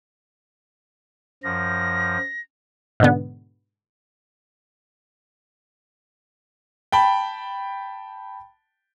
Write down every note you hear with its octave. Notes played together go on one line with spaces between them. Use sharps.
F#2 F3 A#6
G#2 B2 D3 B3
G5 A5 B5